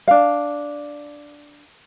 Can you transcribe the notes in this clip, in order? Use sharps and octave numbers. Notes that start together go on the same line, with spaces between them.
D4 F5